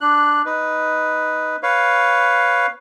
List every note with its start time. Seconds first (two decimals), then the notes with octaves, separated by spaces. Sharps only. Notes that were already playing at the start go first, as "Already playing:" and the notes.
0.01 D4 F#6
0.46 D#4 B4
1.63 B4 C#5 F5